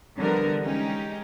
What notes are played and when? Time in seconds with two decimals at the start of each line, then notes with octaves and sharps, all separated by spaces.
0.18 D3 E3 F3 G3 B3 A#4
0.63 G#3 C#4 D#4 G4